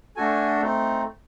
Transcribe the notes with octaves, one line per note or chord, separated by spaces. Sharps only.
A3 D4 F#4 A4 G#5
A3 C4 D#4